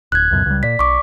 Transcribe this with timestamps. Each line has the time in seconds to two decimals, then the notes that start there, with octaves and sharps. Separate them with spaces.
0.12 D1 F#6 G#6
0.31 C#2 F#2 B2
0.46 C#2 G3
0.63 A#2 D5 B6
0.79 B1 C#6 D6